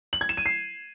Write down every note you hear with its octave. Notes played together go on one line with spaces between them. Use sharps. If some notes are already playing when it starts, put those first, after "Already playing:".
F#7
G#6
E7
D#7
C7